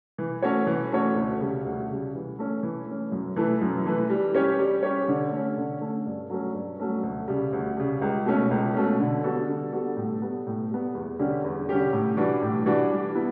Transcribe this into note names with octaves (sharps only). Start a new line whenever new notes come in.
E3
A3 C#4 F#4 C#5
E3
A3 C#4 F#4 C#5
D2
C#3 G3
D2
C#3 G3
E3
A3 C#4
E3
A3 C#4
F#2
E3 A3 E4 B4
F#2
E3 A3 E4 B4
G3
C#4 G4 C#5
G3
C#4 G4 C#5
D3
A3 C#4
D3
A3 C#4
G2
F#3 A3 C#4
G2
F#3 A3 C#4
D2
C#3 G3
D2
C#3 G3
C#2
B2 A3 C#4
C#2
B2 A3 C#4
D3
G3 B3 F#4 A4
D3
G3 B3 F#4 A4
A2
G3 B3
A2
G3 B3
E2
D3 G3 C#4 G4
E2
D3 G3 C#4 G4
A2
E3 G3 D4 F#4
A2
E3 G3 D4 F#4
G3
B3 E4